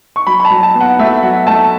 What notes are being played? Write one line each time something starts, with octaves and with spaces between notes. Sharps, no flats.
C#6
F#3 B5
B5
A5
F#3
A5
B3
F#5
A3 E5
F#3 F#5
A3 A5